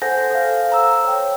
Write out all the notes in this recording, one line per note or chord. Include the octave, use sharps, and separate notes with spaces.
A4 C5 F#5 G#5 G6 A#6
A4 F5
C5 A#5 E6
C#5 G5